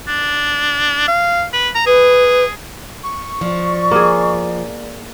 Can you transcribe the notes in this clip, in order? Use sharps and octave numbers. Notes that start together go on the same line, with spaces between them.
D4
F5
B4
A#5
G#4 B4
C#6
F3 D5
A#3 G#4